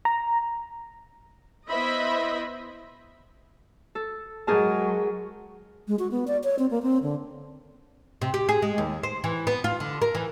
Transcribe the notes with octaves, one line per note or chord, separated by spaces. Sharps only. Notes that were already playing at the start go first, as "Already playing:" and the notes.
A#5
B3 E4 C5 D#5 E5 B5
A4
F#3 G#3 G#4 A#4 A5
G#3
F#4
B3
D5
C#5
C4
A#3
C4
D3
C3
G4
G#4
G#3
D#2
C5
E3
B3
F4
D3
A#4
E3